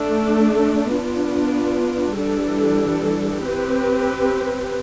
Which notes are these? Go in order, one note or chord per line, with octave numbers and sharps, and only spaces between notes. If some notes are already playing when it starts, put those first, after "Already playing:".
Already playing: A3 D4 A4
B3 D4 F4
E3 G3 D4 A4
C4 G4 B4